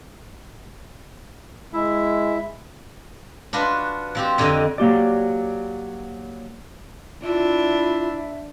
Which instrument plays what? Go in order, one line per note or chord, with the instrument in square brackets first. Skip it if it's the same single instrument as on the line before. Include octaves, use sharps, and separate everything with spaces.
[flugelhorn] G#3 [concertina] E4 E5
[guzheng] D4 F4 F#4 B4
F3 C4 G4
F2 D3 G4 D5 D#5
[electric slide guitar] F#3 A#3 G4 D5
[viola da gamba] D4 [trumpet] E4 [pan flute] F4 [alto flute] E5